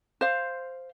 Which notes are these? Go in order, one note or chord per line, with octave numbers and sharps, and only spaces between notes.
C5 F5